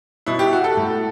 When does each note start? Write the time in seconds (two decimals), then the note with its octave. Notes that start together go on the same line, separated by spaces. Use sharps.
0.26 B2 E4
0.39 G4
0.53 F#4
0.64 A4
0.77 A2